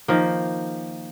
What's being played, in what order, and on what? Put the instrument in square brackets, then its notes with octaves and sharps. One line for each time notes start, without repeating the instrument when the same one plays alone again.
[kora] D#3 F3 A#3